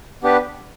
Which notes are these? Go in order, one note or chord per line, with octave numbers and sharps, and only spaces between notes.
B3 D4 G4 B4